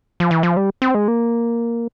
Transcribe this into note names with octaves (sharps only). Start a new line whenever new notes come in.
F3
E3
F3
G3
C4
G#3
A#3